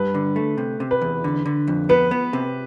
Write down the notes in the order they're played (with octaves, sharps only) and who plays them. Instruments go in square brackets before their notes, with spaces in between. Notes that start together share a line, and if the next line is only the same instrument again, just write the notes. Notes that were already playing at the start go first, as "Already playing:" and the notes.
Already playing: [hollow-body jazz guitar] G2 [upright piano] B4
[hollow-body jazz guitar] D3
A3
C3
C3
[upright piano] B4
[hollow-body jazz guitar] E2
D3
D3
F2
[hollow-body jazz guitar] B3 [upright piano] B4
[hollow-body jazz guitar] B3
C3